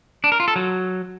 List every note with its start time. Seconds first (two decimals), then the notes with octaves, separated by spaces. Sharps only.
0.24 D4
0.32 A#4
0.40 F4
0.48 A4
0.56 F#3